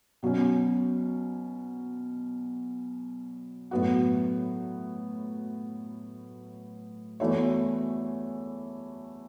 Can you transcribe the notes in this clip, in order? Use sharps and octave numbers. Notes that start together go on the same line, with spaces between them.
B2 F#3 C#4
A2 F#3 B3 F#4
E2 E3 A3 F#4 C#5